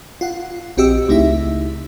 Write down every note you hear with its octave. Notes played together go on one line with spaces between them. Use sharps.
F4 F#5
A#1 C4 F#4 G4 D#5 E6
C#2 A3 D#4 E4 E5